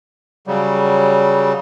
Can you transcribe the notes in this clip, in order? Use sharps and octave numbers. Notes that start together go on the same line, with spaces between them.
C#3 F#3 G3